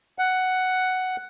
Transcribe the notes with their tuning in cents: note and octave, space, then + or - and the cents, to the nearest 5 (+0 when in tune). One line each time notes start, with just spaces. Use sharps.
F#5 +5